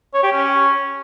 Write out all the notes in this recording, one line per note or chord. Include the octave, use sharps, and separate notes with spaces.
C#5
G4
C#4